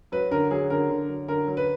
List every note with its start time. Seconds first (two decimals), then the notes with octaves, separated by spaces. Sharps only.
0.12 F#3 B4
0.31 D3 A#4
0.51 F#3 G#4
0.70 D3 A#4
0.89 D3
1.08 F#3
1.28 D3 A#4
1.47 F#3
1.57 B4